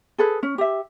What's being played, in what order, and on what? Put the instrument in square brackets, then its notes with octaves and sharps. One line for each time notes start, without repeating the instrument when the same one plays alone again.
[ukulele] G#4 A4 B4
C#4
G4 E5